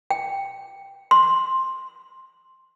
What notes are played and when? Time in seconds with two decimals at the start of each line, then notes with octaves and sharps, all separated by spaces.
0.11 G5
1.11 C6